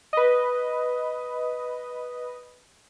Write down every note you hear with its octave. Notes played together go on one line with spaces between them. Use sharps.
B4 D#5